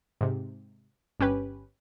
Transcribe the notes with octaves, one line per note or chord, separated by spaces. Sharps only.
G#2 C3
G1 C#4 G4 B4